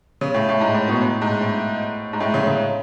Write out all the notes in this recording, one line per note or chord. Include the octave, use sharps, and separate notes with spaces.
C#3
A2
A2
G#2
A2
B2
A2
G#2
A2
G#2
A2
C#3
C#3